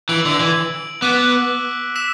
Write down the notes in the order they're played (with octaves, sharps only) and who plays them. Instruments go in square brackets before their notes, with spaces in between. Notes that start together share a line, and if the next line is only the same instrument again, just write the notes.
[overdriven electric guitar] E3 [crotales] E6 D7 F#7
[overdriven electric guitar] D3
E3
[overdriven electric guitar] B3 [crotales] D6 F#6 B6 D7
[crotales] E6 B6 E7